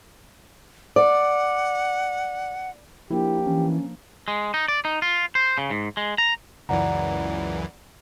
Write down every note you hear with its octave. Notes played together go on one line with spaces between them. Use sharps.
D5 F#5
F3 A#3 D4 E4 G4
E3 C#4
G#3
D#4
D5
D#4
F4
C5
C#3
G#2
G#3
A#5
C#2 F#2 E3 D5 F#5 A#5